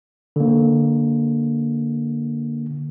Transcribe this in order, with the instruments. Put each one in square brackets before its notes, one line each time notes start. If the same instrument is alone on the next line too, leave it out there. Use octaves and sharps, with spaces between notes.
[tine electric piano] D3 A#3